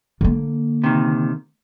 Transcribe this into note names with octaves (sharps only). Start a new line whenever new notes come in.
D3 A#3
C3 D#3